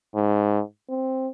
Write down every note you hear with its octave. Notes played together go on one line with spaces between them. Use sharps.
G#2
C4